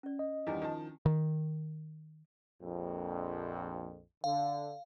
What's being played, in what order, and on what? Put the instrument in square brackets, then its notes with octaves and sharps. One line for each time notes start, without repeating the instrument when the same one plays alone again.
[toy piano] C#4 D5
[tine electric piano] D#5
[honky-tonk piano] E2 D#3 G3 [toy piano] D4 E4 G#5
[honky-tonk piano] D#3 F3 A5
[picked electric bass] D#3
[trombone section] A#1 F2
[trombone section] D3 [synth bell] F5